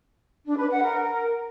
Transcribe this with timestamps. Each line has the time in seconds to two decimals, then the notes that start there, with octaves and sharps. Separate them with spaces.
0.46 D4
0.58 B4
0.70 F#5
0.81 A#4